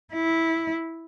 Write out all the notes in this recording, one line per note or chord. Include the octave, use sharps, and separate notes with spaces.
E4